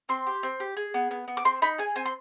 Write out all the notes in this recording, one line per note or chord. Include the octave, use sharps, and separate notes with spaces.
C4 C6
G4
C4
G4
G#4
B3
B3
B3
D6
C4 C6
D#4 B5
G#4 G#5
C4 G#5
C6